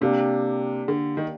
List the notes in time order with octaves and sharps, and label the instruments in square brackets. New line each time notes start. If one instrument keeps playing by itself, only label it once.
[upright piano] C3 [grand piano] A#3 D4 G4 D5 F5
[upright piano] D3
D#3